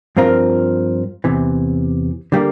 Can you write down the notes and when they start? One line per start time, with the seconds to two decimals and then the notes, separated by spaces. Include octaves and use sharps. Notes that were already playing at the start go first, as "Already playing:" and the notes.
0.17 G2 F3 C4 F4 A#4
1.24 E2 C3 E3
2.32 D3 G3 A#3